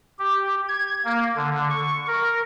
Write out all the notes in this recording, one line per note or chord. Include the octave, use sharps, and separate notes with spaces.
G4
G#6
A#3
D3
C#6
A#4